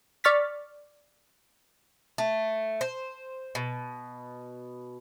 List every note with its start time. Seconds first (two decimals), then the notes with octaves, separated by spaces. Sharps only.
0.24 D5 C#6 F6 A6 B6
2.18 A3
2.81 C5
3.55 B2